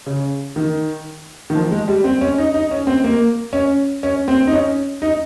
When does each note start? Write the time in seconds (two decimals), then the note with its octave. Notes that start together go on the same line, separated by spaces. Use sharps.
0.06 C#3
0.56 D#3
1.50 D#3
1.55 F3
1.71 G#3
1.88 G3
2.04 C4
2.21 C#4
2.38 D#4
2.54 D#4
2.71 C#4
2.87 C4
3.04 A#3
3.53 C#4
4.03 C#4
4.28 C4
4.47 D#4
4.53 C#4
5.02 D#4